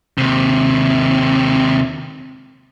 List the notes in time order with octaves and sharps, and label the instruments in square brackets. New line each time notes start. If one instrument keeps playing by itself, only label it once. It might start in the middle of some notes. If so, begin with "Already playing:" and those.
[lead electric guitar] D#2 C3